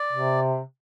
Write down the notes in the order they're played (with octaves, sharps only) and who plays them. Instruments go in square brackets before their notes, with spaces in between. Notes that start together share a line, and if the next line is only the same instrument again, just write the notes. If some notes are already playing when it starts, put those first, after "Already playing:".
Already playing: [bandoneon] D5
[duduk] C3